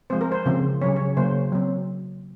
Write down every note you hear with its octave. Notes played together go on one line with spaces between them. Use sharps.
F3 G#3 C4 C5
A#4
C5
C#3 F3 C4
C#3 F#3 C#4 C#5
C#5
C#3 F#3 A#3 C5
F#3 C4